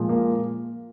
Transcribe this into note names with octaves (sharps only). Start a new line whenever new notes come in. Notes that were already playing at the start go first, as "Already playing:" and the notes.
Already playing: A#2 F3 G#3
A#3